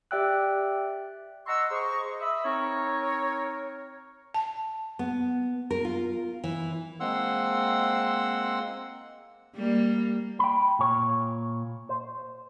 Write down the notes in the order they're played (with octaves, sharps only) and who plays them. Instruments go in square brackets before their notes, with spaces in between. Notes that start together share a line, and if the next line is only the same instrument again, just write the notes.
[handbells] G4 D5 E5 G5 E6 F#6
[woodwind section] D#5 F#5 A#5 C6 C#6 E6
G#4 C5 D#5 A#5 C6 C#6
E5 B5 D#6 E6
C4 D#4 A#4 C#5
[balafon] A5
[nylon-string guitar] B3
A#4
F4
E3
[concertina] G#3 A#3 C4 F#5 C6 E6
[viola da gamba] G3 A#3
[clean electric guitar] G5 B5
A#2 C#5
C5